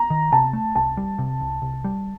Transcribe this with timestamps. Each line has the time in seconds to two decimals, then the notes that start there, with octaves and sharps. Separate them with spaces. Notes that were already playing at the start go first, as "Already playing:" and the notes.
Already playing: A#5
0.10 D#3
0.32 C3 A5
0.53 A3
0.75 C2 A5
0.97 G3
1.18 C3
1.41 C2
1.62 C2
1.84 G3